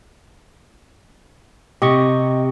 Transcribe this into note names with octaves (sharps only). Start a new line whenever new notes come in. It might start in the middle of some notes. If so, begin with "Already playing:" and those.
C3 G4 D#5 C#6